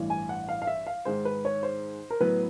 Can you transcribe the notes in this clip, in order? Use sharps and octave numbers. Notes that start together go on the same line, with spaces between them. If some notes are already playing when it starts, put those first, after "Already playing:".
Already playing: A1 G2 E3
G#5
F#5
F5
F5
E5
F5
G#2 D#3 G#3 C5
B4
C#5
C5
A#4
A2 F#3 B3 B4